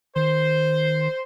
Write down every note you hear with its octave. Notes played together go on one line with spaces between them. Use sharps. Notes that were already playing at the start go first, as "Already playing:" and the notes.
D#3 C5